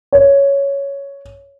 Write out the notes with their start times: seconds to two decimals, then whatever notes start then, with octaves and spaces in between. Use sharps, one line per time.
0.12 C#5